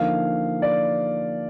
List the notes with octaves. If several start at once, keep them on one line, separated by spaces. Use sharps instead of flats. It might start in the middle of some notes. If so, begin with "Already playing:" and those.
Already playing: D3 F3 A#3 D#4 F5
D5